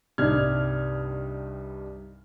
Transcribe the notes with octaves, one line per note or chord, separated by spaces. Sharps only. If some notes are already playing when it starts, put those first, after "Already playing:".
C2 G2 D4 D#4 F6 G#6